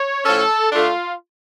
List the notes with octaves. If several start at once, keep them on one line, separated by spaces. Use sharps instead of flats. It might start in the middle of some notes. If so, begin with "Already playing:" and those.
Already playing: C#5
A2 F3 C#4 A4
D3 A3 D4 F4